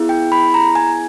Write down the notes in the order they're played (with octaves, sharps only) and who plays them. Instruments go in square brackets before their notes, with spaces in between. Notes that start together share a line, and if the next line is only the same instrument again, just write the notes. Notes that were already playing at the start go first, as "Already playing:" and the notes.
Already playing: [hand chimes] B3 E4 G#4
G5
B5
A#5
G#5